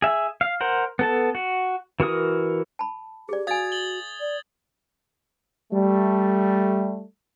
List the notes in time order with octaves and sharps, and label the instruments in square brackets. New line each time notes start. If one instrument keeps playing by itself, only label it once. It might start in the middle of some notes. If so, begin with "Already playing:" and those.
[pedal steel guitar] G#4 E5
F5
A#4 C5 F#5
B3 A4 A5
F#4
E3 F#4 A#4 D#6
[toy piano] A5 B5
[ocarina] G4 [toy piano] G#4 D5
[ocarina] F#4 [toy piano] F5 G#5 [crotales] D#6 G#6 A6
[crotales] A6 F#7 G7
[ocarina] D5
[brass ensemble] G3 A3